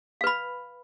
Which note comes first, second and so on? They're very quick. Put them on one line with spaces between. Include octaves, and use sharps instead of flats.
F5 B4 B5